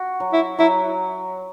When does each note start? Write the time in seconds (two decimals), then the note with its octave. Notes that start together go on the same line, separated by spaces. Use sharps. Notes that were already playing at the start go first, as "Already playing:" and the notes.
Already playing: F#4
0.20 F#3
0.33 E4
0.59 F#3 E4